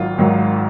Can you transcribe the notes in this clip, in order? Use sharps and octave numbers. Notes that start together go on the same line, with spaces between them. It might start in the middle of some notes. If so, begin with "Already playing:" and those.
Already playing: G#1 G#2 D#3 F#3 F4
G#1 G#2 D#3 F#3